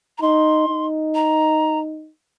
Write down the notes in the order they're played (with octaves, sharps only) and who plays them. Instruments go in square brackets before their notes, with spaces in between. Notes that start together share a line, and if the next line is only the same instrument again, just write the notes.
[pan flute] A#5
[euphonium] D#4 [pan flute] C6
[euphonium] D#4
[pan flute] A#5